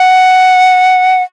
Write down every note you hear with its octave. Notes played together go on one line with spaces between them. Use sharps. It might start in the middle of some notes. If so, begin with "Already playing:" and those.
Already playing: F#5